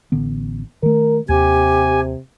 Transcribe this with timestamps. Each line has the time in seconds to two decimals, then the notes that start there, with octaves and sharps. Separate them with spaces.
0.12 A1 D3 B3
0.83 D#3 A3 A#4
1.29 D#2 C3 G4 G#5